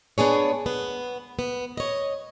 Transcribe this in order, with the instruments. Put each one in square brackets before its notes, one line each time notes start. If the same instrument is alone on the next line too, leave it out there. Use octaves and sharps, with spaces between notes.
[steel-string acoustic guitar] B3 D4 G#4 C#5
B3
B3
C#5 D#5